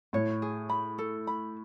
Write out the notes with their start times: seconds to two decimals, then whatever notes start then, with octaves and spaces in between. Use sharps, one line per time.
0.13 A2 C#5
0.42 G#4
0.70 B5
0.98 A4
1.27 B5